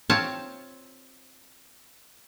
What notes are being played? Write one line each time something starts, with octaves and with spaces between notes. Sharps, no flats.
C4 F4 C#5 F5 A5